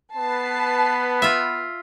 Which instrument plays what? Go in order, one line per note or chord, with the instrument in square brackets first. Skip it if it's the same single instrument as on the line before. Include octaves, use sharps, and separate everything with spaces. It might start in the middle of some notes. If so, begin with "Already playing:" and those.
[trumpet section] B3 B4 [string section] A5 C7
[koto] F4 E5